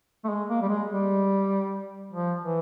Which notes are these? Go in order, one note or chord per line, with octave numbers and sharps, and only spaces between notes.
A3
G#3
A#3
G3
G#3
G3
F3
E3